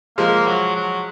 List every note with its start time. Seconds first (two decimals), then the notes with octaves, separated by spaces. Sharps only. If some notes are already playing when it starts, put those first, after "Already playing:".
0.18 F3 G#3 A#3
0.47 F#3
0.76 F#3